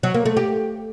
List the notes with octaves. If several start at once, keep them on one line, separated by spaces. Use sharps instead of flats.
F#3
A#3
A3
G4